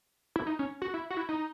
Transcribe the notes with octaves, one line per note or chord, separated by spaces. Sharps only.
E4
D#4
C#4
F#4
E4
F#4
E4
D#4